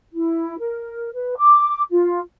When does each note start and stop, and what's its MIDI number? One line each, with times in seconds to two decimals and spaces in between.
0.12 0.54 64
0.59 1.12 70
1.13 1.36 71
1.37 1.80 86
1.90 2.19 65